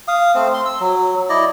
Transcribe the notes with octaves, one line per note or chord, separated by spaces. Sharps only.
F5 D#6
A3 C4 C5
C6
E6
F#3
E4 D5 D#5